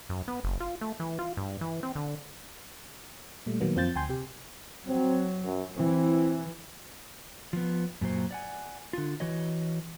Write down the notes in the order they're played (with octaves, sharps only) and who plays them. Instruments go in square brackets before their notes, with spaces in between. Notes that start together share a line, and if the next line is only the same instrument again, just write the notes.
[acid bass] F#2
B3
F#1
F4
A3
E3
F4
G2
E3
C4
D3
[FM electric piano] A#2 G3 A3
A#2 D#3 F#3 A#3 B3
F2 C4 F4 G6 A6
D2 G5 G#5 C6 G6
C3 G4
[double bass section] F#3 [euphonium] C4
[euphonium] F#2
[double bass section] E3 [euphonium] C4
[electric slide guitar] F3 B3
F#2 A#2 F#3 C5
D5 F#5 G#5
D3 F4
E3 F#4 C#5 D#5